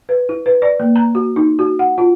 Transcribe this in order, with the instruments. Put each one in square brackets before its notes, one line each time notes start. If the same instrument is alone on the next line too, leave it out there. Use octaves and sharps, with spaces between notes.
[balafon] B4
E4
B4
D5
A#3
A#5
F#4
D#4
F#4
F#5
F4